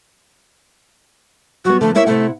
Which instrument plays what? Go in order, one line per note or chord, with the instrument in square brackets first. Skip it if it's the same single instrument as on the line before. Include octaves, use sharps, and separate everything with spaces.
[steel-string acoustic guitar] F#3 G3 B3 [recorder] F#4
[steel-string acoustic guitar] D3 F3 [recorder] A3
[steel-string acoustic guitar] A#3 E4 C#5 [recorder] E5
[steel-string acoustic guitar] C3 E4 F#5 [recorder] A3